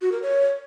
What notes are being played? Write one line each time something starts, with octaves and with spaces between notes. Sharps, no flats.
F#4
A#4
C#5